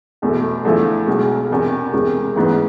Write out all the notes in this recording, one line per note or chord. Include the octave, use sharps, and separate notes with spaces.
F1 E2 B2 A3
E2 D3 F3 A3 E4
B1 B2 G#3
E1 E2 C3
E1 E2 C3 G#3
A1 G#2 E3 B3